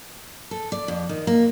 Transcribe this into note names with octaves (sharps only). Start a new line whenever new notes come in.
A4
D5
F2
D#3
A#3